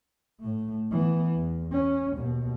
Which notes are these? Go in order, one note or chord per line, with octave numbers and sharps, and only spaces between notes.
A2 A3
E3 B3
E2
C#4
D#2 B2